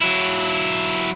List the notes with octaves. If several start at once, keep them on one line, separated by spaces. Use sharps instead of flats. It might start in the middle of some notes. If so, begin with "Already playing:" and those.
F#3 E4